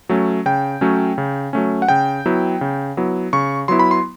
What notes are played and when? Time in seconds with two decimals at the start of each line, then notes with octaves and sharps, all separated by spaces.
0.09 F#3 A3 C#4
0.46 C#3 G5
0.81 F#3 A3 C#4
1.18 C#3
1.53 F#3 A3 C#4
1.82 F#5
1.89 C#3 G5
2.26 F#3 B3 E4
2.61 C#3
2.97 F#3 B3 E4
3.33 C#3 C#6
3.68 F#3 B3 E4 C6
3.79 B5
3.91 C6